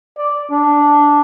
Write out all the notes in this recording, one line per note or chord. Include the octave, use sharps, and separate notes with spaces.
D5
D4